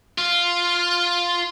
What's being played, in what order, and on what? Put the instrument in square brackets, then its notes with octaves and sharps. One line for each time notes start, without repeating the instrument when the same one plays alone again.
[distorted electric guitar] F4